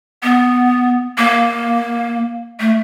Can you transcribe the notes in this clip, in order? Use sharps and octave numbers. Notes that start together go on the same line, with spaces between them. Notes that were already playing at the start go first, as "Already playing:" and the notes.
B3
A#3
A3